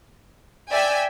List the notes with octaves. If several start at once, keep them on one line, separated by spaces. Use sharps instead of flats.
D5 E5 G5 G#5